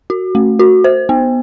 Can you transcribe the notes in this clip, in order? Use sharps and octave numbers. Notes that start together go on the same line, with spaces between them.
F#4
A3
F#4
C5
B3